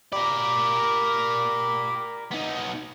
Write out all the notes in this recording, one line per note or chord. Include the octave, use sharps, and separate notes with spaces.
G4 A#4 D5 B5
B3 D#4